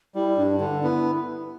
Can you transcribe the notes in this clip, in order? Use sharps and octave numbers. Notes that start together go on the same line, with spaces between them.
G3 E4
G2 D4
D3 D4
B3 E4